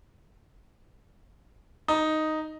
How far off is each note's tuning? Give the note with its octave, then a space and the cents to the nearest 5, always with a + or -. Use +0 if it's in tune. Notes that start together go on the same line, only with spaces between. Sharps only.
D#4 +0